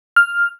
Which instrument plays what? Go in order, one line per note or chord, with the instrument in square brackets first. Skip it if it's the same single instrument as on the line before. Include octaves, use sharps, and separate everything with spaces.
[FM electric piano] F6